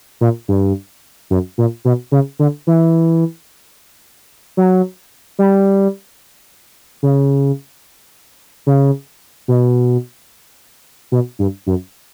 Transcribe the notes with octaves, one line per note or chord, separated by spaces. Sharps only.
A#2
G2
F#2
A#2
B2
C#3
D3
E3
F#3
G3
C#3
C#3
B2
B2
G2
F#2